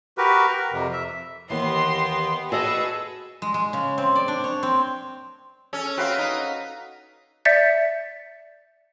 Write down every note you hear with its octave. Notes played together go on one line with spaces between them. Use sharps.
F#4 G4 A#4 B4
A#4
F2 C3
E5
D#2 E3 B3 G4 D#5 C6
F#4 G#4 A4 B4 D5 D#5 E6
G#3
G#3
C#3
C4
D5
D4
C#5
C4
C#4 A4
C4 F#4 B4 F5
D#4
D5 E5 G6 A6 B6 C#7